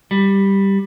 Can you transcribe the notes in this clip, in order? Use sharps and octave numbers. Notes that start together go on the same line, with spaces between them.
G3